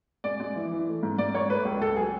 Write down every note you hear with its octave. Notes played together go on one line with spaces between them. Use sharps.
G#3 D5
G#3
E3
E3
A3
G#2
G#2 D5
G#2 C#5
A3 B4
C#2
C#2 A4
F#3 G#4